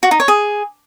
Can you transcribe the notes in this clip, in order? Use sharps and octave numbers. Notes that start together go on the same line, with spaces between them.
F#4
D#4
C#5
G#4